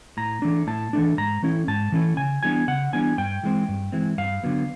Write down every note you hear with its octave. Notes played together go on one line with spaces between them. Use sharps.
A2 A#5
E3 A3 D4
A2 A5
E3 A3 D4
G#2 A#5
E3 A3 C#4 E4
G#2 A5
E3 A3 C#4 E4
C#3 G#5
E3 G3 B3 D4 G#5
C#3 F#5
E3 G3 B3 D4 G#5
G2 G5
E3 G#3 C4
G2
E3 G#3 C4
G2 F5
D3 F#3 B3